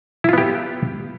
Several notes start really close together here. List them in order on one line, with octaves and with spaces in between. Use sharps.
E4 F4 B3 G4